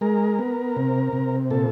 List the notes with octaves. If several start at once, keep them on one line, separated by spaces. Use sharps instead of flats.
G#3 A#4
B3
C3
C3
A#2 A4